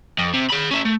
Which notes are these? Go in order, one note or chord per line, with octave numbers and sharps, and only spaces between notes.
F2
C3
G#4 B5
C#4 E4
A3